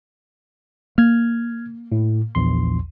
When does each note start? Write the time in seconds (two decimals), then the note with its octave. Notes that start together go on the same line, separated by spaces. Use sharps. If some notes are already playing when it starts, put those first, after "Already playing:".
0.98 A#3 F6 G#6
1.92 A2
2.35 A#1 E2 C6